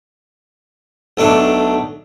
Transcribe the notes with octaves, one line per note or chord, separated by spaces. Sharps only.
B1 A3 D4 D6